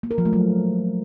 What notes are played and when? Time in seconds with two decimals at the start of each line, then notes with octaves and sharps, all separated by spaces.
0.03 A#3
0.11 A#4
0.18 F3
0.25 A3
0.33 F#3